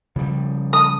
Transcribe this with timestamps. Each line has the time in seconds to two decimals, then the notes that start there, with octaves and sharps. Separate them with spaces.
0.16 C#3 F3 G3
0.73 D#6